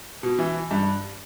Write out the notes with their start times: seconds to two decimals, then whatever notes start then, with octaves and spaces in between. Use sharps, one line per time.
0.23 B2
0.39 E3
0.71 G2